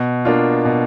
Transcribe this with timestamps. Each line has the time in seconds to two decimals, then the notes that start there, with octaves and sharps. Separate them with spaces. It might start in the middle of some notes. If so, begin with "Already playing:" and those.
Already playing: B2
0.25 A#3 D4 F4
0.65 B2